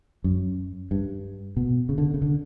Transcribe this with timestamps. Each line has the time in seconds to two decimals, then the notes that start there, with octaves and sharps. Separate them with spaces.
0.24 F#2
0.91 G2
1.57 B2
1.89 C#3
1.98 D3
2.14 C#3
2.22 D3